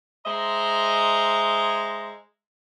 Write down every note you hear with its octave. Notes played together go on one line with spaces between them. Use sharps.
G#3 C5 D#5 E5 A#5